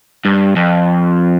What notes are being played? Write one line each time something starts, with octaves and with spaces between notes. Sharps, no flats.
G2
F2